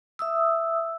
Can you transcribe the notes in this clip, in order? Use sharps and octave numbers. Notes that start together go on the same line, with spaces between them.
E5 D#6 E6